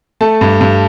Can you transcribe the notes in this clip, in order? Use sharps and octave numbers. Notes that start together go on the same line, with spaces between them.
A3 A5
G2
G2